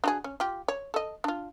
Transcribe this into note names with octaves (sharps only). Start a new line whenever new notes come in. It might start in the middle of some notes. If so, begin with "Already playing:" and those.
D4 F#4 G#4
C#4
F4 G4
C#5
A4 D#5
D4 F4